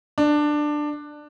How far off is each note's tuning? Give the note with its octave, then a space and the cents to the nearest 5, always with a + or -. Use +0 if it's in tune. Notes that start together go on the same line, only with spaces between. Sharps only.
D4 +15